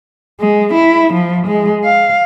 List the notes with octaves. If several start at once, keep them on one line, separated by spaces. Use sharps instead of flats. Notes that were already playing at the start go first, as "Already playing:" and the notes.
G#3
E4
F3
G#3
F5